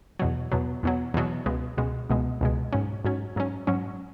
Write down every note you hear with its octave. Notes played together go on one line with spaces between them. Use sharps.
E2 B2 F#3
E2 B2 F#3
E2 B2 F#3
E2 B2 F#3
C#2 B2 G#3
C#2 B2 G#3
C#2 B2 G#3
C#2 B2 G#3
G#2 F#3 C#4
G#2 F#3 C#4
G#2 F#3 C#4
G#2 F#3 C#4